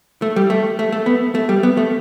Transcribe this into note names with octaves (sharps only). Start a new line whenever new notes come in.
A3
G3
A3
A3
A3
B3
A3
G3
B3
A3